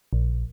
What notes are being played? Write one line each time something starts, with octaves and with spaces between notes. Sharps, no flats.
A#1